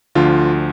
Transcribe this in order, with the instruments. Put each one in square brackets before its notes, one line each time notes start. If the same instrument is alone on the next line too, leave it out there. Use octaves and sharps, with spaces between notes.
[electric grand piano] D2 D3 F3 F4